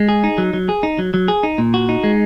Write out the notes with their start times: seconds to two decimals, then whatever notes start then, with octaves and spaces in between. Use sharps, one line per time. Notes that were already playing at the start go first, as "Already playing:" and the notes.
Already playing: G#3
0.09 G#4
0.24 D#4
0.38 F#3
0.54 F#3
0.69 G#4
0.83 D#4
0.99 F#3
1.14 F#3
1.28 G#4
1.43 D#4
1.58 A#2
1.74 F#4
1.89 D#4
2.04 G#3